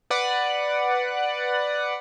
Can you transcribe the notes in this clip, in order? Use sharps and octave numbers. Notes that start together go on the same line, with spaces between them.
B4 D5 F#5